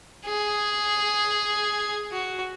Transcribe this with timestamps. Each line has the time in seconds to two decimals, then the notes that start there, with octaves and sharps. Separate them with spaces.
0.25 G#4
2.11 F#4